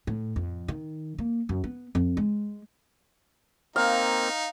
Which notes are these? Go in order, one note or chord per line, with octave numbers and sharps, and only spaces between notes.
A2
F2
D#3
A#3
F#2
B3
F2
G#3
A#3 C4 D#4 F5